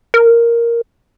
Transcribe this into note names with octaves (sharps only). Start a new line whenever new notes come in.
A#4